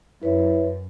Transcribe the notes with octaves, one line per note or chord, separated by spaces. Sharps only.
F#2 E4 B4 C#5 E5